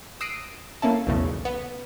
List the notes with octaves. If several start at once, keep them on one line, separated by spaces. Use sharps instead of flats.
D#6 E6 F#6 A#6 C7 D7
A#3 C#4 E4 A4
B1 E2 A2 C#3
B3